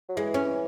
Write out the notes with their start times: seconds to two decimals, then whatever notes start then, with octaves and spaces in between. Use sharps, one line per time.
0.09 F#3
0.17 E3 G#3
0.34 C#4